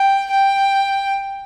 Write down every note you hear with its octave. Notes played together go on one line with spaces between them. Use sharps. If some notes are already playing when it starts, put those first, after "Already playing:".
Already playing: G5
G5